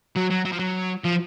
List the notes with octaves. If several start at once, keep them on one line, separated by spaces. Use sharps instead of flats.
F#3
F#3
F#3
F3
F#3
F3